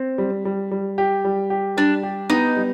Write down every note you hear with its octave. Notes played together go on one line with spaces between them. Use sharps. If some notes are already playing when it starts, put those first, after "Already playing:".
Already playing: C4
G3
G3
G3
G4
G3
G4
G3 D4
G4
B3 D#4
G3